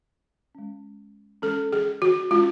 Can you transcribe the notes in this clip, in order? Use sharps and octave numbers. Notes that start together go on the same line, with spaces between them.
G#3 C#4
G#3 C#4 A4
G#4
F#4
G#3 C#4 F4